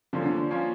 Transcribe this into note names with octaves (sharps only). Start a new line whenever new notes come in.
D3 F3 A#3 C#4
D3
F3 A#3 C#4